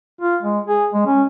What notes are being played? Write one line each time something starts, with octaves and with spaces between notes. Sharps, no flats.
F4
G#3
G#4
G#3
C#4